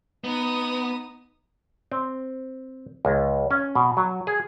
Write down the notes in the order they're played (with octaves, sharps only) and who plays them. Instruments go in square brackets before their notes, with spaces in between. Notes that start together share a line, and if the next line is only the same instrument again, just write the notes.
[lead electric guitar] B3 [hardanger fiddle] D#4 D#6
[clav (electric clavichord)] C4
C#2
C#4
B2
F#3
G#4